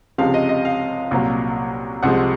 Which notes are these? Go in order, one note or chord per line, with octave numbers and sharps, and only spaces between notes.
C#2 C3 F3 G#3 F5
D#5
D#5
F5
C2 A#2 F#3
C2 C3 F3 G#3 F#5